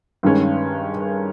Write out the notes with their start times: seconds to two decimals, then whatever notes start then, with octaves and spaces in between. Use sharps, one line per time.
0.23 G2 D#3 G#3 C#4